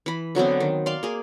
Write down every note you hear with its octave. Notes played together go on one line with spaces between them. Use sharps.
E3 B5
D3 F#3 B3 C4
D#3
D5 F5 C6
A#3 G#4